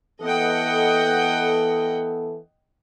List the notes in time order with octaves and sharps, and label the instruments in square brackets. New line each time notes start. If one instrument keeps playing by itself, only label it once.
[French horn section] E3 B3 A4 [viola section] D#5 F#5 G5